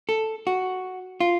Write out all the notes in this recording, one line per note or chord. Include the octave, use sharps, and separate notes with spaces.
A4
F#4
F4